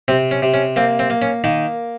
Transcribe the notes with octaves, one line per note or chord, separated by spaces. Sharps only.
C3 C4
C#4
C3
C#4
A#3 C4
C4
A#3
C#4
D#3 A#3 D#4